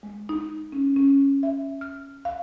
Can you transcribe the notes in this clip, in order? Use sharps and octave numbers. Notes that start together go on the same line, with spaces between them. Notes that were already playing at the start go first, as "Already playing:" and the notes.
G#3
D#4
C#4
C#4
E5
F6
F5